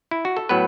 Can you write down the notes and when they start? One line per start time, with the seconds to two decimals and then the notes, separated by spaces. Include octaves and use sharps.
0.11 E4
0.25 F#4
0.37 A4
0.49 A2 F#3 B3 B4